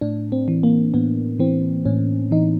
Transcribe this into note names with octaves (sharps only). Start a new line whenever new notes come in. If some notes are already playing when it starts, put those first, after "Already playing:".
A2 D4
C4
E3
A#3
A2 B3
E3 C4
A2 C#4
E3 D#4